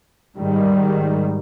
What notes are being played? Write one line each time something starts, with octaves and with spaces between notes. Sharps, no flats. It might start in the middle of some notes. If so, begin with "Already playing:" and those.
G#2 D#3 G3